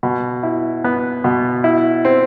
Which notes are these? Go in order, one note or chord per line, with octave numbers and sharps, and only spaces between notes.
B2
E4
B3
B2
E4
C4